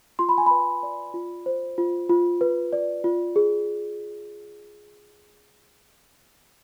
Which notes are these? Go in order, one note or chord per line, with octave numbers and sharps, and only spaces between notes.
F4 C6
B5
G#5
B4 B5
D5
F4
C5
F4
F4
B4
D5
F4
G#4